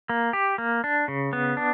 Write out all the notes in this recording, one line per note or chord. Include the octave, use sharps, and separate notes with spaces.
A#3
G4
A#3
D4
C#3
B3
D4